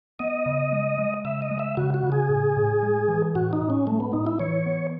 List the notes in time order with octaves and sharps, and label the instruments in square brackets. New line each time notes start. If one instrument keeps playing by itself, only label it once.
[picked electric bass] B3 [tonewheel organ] D#5
[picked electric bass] C#3
G#3
G#3
[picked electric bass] C#3 [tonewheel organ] E5
[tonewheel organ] D#5
[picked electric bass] G#3
[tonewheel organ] E5
[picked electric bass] C#3 [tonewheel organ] F#4
[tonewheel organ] F#4
[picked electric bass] C#3
[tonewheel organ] G#4
[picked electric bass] A2
A2
G#3
E3
[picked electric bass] A2 [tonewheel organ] F#4
[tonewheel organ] D#4
[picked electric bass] A2
[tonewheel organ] C#4
[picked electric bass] G#3 [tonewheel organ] A3
[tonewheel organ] B3
[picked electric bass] A2 [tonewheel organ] D#4
[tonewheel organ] E4
[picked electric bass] E3 [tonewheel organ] C#5
[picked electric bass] B3